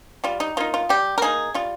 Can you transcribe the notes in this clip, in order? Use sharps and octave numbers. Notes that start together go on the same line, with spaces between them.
G3 F4
D#4
A#3 D#4 F4
F4
G3 G4
A#4
A#3 D#4 G#4
G3 F4